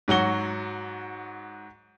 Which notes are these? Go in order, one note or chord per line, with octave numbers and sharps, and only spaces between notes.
G#2 F#3 F#4 G7